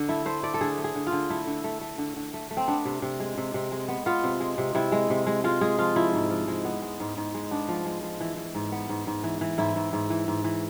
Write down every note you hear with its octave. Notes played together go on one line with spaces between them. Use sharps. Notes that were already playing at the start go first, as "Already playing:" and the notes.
Already playing: D3
A3 E4
A3 C5
A3 D5
A4
D3 G#4
A3
G#4
D3
F4
D3
A3 E4
D3
A3
A3
D3
D3
A3
A3
C4
B3 D4
C3
C3
G#3
C3
C3
G#3
B3
B3 F4
C3
G#3
C3
C3 E4
G#3
C3
G#3
G#3 F4
G#3 G#4
F3 F4
F3 E4
G#2
F3
G#3
B3
G#3
G#2
G#2
G#3
B3 D4
F3
G#3
F3
E3
E3
G#2
B3
G#2
G#2
E3
E3
G#2 E4
G#2
G#2
E3
G#2
E3